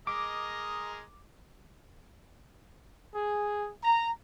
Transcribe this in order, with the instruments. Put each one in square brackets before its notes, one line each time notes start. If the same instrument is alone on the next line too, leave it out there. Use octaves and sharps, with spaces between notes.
[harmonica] G#3 A#4 D#5 [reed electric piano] D6
[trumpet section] G#4
A#5